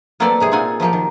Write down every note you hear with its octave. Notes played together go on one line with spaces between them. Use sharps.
F#3 A#3 C4 A4 B4 D5
C3 G#3 G#4
A#2 C4 D#4 F4 F#5 G#5
F3 F#3 A#3 G4
D#3